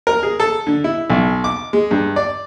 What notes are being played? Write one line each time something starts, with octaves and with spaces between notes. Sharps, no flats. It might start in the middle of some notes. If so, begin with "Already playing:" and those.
A#4
G#4
A4
D3
E4
B1
D6
G#3
G2
D5